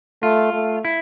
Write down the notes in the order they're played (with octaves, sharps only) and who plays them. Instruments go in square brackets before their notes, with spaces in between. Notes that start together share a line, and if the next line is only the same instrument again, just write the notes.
[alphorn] A3 [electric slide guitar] F4
[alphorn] A3
[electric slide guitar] E4